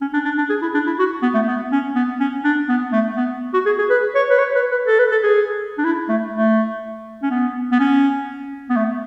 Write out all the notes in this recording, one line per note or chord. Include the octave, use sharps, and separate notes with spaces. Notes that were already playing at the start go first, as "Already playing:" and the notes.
C#4
D4
D4
D4
G#4
E4
D4
E4
F#4
B3
A3
B3
C#4
B3
C#4
D4
B3
A3
B3
F#4
G#4
G#4
B4
C#5
B4
C#5
B4
B4
A4
B4
A4
G#4
D4
E4
A3
A3
C#4
B3
B3
C#4
B3
A3